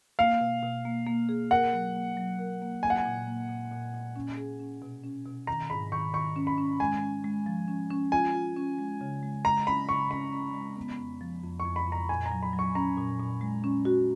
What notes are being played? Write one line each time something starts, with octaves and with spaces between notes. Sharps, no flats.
A#3 F5
B2
B2
A#3
A#3
G#4
A#4 F#5
F#3
A#3
F#3
A#4
A#3
A#3 G#5
F#5
G#5
A#2
A#3
A#2
A#2
A#2
C#4
G#4
C#4
B2
C#4
B2
D#3 A#5
G#2 B5
D#3 C#6
D#3 C#6
C#4
B5
C#4
G#3 G#5
C#4
G#3
F3
C#4
C#4
F4 G#5
F4
C#4
G#3
C#3
G#3
G#3 A#5
C#4 B5
C#3 C#6
C#4 B5
C#4
G#3
B3
F2
F3
F2
C#6
F2
B5
F2 A#5
A#2 G#5
A#5
F#3
B5
F#3
C#6
C#4 A#5
A#2
A#2
G#3
C#4
F#4